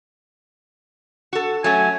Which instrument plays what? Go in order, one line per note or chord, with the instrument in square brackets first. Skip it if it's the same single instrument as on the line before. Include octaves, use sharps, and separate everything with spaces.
[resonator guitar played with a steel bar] F#4 A4
[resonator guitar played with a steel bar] F#3 A3 C#4 [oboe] G#5